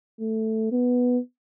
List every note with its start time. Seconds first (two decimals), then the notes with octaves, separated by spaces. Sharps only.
0.20 A3
0.72 B3